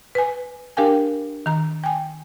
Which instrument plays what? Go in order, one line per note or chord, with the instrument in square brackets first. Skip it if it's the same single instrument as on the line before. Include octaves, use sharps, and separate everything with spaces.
[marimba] B4 G#5
D4 G4 A#4 F5 G5 G#5
D#3 A#5
G5 G#5